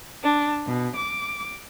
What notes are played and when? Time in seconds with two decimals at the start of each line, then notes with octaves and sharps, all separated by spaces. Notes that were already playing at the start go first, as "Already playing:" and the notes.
0.21 D4
0.66 B2
0.96 D6